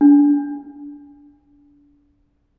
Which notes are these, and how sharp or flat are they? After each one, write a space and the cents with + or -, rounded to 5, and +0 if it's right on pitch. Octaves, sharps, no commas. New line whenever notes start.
D4 -30